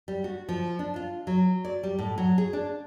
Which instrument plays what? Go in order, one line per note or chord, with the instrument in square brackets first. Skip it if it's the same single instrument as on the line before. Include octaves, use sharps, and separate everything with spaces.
[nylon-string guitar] G3
F#4
F3
D4
F4
F#3
D5
G3
A2
F#3
G#4
D4